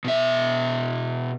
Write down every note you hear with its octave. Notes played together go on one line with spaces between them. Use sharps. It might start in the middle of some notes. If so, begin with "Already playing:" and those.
B2 E5